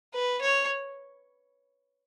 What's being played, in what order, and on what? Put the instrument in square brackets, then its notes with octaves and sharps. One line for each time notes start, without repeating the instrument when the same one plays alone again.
[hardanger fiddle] B4
C#5